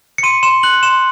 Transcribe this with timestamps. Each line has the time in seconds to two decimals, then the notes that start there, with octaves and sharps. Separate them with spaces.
0.18 C#7
0.23 C6 D#7
0.43 C6 E7
0.63 F#6 F#7
0.83 C6 E7